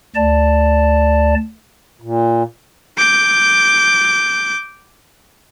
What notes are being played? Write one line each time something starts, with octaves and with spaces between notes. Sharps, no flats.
D2 D5 A5
A#2
D6 G6